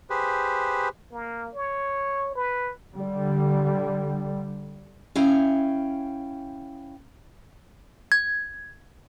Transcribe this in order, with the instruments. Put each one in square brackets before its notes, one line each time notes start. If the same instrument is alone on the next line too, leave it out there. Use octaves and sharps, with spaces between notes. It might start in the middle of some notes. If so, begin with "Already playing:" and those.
[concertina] G4 G#4 B4 C5
[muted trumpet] A#3
C#5
B4
[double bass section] D3 G3
[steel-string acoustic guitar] C#4 E4 F5 G5 G#5
[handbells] G#6